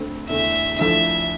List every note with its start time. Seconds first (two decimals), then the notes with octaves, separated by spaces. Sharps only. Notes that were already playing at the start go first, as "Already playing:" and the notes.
Already playing: D2 D3 A3 C4
0.30 E2 D3 A3 E4 E5
0.79 D2 D3 F3 A3 E4 E5